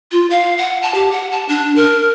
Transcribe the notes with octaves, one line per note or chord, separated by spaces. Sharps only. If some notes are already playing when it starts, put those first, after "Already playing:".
F4
F5
F#5
A5
G4
F#5
A5
D4
A#4